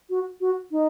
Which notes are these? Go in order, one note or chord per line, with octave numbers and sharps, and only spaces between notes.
F#4
F#4
D#4